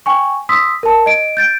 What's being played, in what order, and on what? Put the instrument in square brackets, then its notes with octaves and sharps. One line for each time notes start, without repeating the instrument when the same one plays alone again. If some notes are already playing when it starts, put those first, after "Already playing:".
[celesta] G5 G#5 C#6
C6 D#6 E6 B6
A#4 A5
D#5 D7
G6 A6 D7